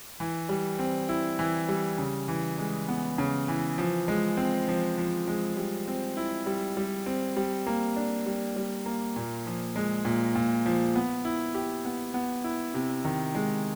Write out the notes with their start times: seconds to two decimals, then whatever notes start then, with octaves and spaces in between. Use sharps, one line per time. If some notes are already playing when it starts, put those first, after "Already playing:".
0.20 E3
0.49 G3
0.79 C4
1.09 E4
1.39 E3
1.69 G3
1.98 C#3
2.28 E3
2.58 G#3
2.88 B3
3.18 C#3
3.48 E3
3.78 F3
4.08 G#3
4.37 C4
4.68 F3
4.98 F3
5.28 G#3
5.57 G3
5.88 C4
6.17 E4
6.46 G3
6.77 G3
7.06 C4
7.36 G3
7.66 A#3
7.96 D4
8.26 G3
8.56 G3
8.86 A#3
9.16 A#2
9.46 F3
9.76 G#3
10.05 A#2
10.35 A#2
10.66 F3
10.95 B3
11.25 E4
11.55 G4
11.85 B3
12.14 B3
12.44 E4
12.74 C3
13.05 D#3
13.35 G#3